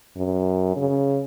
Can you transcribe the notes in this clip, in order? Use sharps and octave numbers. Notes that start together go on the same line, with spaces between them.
F#2
C#3